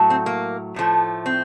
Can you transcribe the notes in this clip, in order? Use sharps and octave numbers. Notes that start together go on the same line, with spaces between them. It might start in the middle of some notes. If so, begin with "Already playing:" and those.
Already playing: A2 F#3 A3
C4
A#3
A2 F3 A3
C4